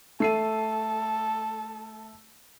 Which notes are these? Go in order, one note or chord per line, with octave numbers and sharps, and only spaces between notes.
A3 A4 C7 D#7